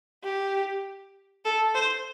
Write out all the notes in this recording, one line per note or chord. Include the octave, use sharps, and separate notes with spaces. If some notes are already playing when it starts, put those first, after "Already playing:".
G4
A4
C5